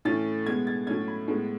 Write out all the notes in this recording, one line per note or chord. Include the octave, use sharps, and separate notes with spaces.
A2 E3 A3 C#4 A6
B2 G#3 B3 G#6
A6
A2 F#3 A3 C#4 G#6
B5
A2 G#3 B3